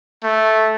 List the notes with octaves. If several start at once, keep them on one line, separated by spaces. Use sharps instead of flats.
A3